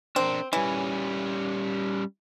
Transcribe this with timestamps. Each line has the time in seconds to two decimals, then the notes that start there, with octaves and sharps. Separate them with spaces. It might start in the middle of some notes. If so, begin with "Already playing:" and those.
0.16 C4 D4 A#4
0.53 E3 G3 C#4